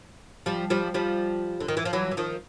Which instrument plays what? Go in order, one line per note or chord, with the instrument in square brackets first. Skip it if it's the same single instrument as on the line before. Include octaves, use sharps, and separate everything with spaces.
[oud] F3 G3
F3 G3
F3 G3
D3
D#3
E3
F3
E3 F#3
E3
D#3 F3